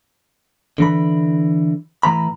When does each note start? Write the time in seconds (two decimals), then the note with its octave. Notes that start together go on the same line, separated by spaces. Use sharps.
0.78 D3 E3 B5
2.03 A2 E3 A#5 B5